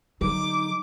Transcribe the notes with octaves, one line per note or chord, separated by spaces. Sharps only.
D3 F#3 D#4 D6